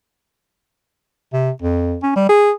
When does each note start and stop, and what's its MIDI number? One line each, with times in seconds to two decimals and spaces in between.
1.33 1.51 48
1.62 1.96 41
2.03 2.15 61
2.16 2.27 55
2.29 2.51 68